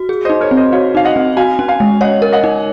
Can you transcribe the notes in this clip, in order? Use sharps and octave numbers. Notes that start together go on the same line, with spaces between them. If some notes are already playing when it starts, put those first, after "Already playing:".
Already playing: F#4
G#4
D#4 C5 D#5
A#4 C#5
C4
C5 D#5
F#4 C#5 F5
D#4 F5
D#5 F#5
C4
F#4 F5 G#5
C#4
F5 G#5
G#3
C#5 D#5 F#5
A#4
D#5 F#5
D#4